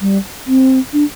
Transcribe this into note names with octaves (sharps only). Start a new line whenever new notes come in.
G3
C4
D4